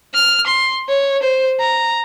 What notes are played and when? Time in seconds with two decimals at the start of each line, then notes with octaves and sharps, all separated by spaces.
0.14 F6
0.47 C6
0.89 C#5
1.22 C5
1.60 A#5